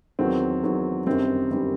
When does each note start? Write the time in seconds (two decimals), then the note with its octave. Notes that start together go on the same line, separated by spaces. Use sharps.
0.19 E2 D#3 F#3 C4
0.63 E2 D#3 F#3
1.06 G1 F#2 D#3 G3 C4
1.50 G1 F#2 D#3 G3